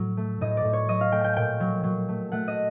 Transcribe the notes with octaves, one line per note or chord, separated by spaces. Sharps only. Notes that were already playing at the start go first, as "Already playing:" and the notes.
Already playing: A2 F#3
A3
A2 D#5
D5
A2
C#5
F#3 D#5
F5
A3 G5
G5
A#2 G5
F#3
F#3
A3
A3 F#5
D#5